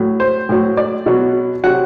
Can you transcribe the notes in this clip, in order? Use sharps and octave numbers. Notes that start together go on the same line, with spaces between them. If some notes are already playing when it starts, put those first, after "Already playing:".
Already playing: A2 F#3
C5
A2 F#3
D5
B2 F#3
C3 F#3 F#5